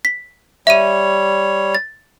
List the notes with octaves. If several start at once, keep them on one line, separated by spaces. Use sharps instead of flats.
B6
G3 C#5 E5 D#7
A6